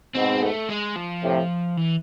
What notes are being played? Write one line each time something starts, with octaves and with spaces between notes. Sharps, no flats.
G#2 B2 C4
A3
G#3
F3
A2 C3
E3